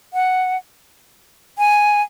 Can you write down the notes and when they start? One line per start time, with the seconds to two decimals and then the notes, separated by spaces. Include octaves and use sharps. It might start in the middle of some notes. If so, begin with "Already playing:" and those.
0.14 F#5
1.58 G#5